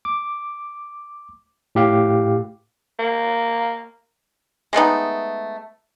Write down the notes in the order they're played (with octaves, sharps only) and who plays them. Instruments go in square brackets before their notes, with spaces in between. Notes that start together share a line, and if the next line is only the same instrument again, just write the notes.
[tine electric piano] D6
A2 G4 F5
[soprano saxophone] A#3
[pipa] G#3 A3 B3 D#4